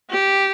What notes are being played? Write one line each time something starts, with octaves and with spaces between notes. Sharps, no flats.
G4